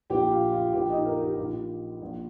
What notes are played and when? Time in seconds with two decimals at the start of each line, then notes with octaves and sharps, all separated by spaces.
0.10 A#1 A#2 G4 G5
0.31 F4 F5
0.52 F4 F5
0.73 A#1 A#2 G4 G5
0.90 D#4 D#5
1.05 A#4
1.22 G4
1.37 A#1 A#2
2.02 A#1 A#2